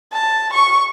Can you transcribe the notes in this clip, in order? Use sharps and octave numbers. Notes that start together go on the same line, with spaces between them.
A5
C#6